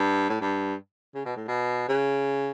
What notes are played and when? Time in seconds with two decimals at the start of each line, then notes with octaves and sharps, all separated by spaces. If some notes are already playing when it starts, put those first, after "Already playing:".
Already playing: G2
0.30 A2
0.41 G2
1.15 C#3
1.26 B2
1.37 A2
1.48 B2
1.89 C#3